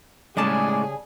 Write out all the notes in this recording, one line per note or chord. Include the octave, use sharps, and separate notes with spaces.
A2 C#3 G3 G#3 C#4 G#4 D5 A5